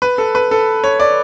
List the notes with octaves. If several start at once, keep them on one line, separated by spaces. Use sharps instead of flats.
B4
A4
B4
A4
C#5
D5